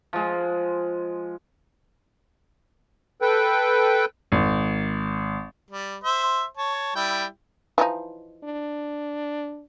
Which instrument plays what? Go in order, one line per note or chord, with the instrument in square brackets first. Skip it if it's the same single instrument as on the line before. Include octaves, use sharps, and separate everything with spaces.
[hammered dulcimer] F3 G#3
[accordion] A4 B4 G5
[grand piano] G#1
[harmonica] G3
C5 E5
C#5 A5
G3 E4 G5
[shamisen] E3 F3 D#4
[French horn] D4